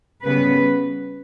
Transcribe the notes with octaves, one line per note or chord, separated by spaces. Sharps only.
C#3 G3 B3 B4